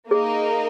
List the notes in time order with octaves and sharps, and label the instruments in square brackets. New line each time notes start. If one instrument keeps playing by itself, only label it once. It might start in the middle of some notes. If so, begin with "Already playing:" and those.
[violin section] A#3 D#4 A#4 D#5 [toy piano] G#4